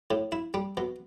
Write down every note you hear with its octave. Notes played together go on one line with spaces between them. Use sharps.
A2
E4
G3
B2